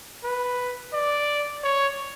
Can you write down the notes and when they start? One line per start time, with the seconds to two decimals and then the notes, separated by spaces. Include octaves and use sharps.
0.24 B4
0.93 D5
1.64 C#5